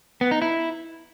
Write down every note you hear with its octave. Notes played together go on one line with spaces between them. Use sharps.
B3
D#4
E4